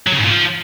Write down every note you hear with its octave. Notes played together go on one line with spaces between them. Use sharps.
F#3
C#3
G#2
A#2
F3